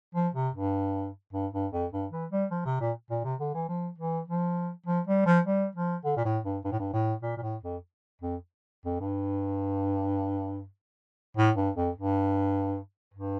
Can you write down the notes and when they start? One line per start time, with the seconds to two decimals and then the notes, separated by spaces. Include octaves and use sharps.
0.15 F3
0.35 C3
0.54 G2
1.33 G2
1.53 G2
1.72 F2
1.92 G2
2.11 E3
2.31 G3
2.51 F3
2.66 C3
2.81 A#2
3.10 A#2
3.24 C3
3.40 D3
3.54 E3
3.68 F3
3.98 E3
4.28 F3
4.86 F3
5.07 G3
5.26 F3
5.46 G3
5.76 F3
6.04 D3
6.17 A#2
6.25 A2
6.44 G2
6.65 G2
6.72 A2
6.79 G2
6.93 A2
7.23 A#2
7.37 A#2
7.42 A2
7.63 F2
8.22 F2
8.85 F2
9.00 G2
11.37 A2
11.56 G2
11.76 F2
11.95 G2
13.14 G2